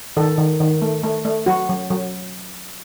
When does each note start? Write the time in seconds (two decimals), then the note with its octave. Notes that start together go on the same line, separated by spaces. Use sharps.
0.17 D#3 A4
0.38 D#3
0.60 D#3
0.82 A3
1.04 A3
1.25 A3
1.46 F#3 F#4
1.69 F#3
1.90 F#3